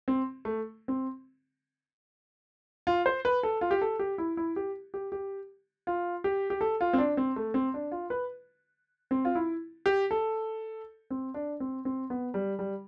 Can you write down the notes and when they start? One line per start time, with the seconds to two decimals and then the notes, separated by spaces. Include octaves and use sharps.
0.08 C4
0.45 A3
0.88 C4
2.87 F4
3.06 C5
3.25 B4
3.43 A4
3.61 F4
3.71 G4
3.82 A4
3.99 G4
4.18 E4
4.37 E4
4.56 G4
4.94 G4
5.12 G4
5.87 F4
6.24 G4
6.50 G4
6.61 A4
6.81 F4
6.93 C4
6.98 D4
7.17 C4
7.36 A3
7.54 C4
7.74 D4
7.92 F4
8.10 B4
9.11 C4
9.25 F4
9.35 E4
9.86 G4
10.11 A4
11.10 C4
11.34 D4
11.60 C4
11.85 C4
12.10 B3
12.34 G3
12.59 G3